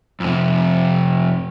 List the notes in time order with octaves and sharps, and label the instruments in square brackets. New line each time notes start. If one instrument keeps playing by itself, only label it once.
[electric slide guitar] F2 C3